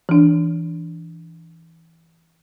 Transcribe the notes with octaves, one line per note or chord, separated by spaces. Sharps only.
E3 D4